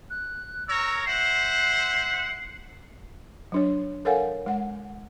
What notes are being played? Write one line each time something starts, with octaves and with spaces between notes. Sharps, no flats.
F#6
A#4 C#5 A#5 E6
C5 E5 F#5 C7
F#3 D4 C#5
A4 A#4 C#5 F5 F#5 G#5
G#3 F#5